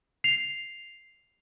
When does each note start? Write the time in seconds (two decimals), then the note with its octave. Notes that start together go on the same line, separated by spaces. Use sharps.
0.24 C7 F7